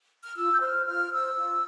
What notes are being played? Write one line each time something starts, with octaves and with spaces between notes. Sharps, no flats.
F6
F4 E6
G6
C5 F6
F4 F6
C5 E6
F4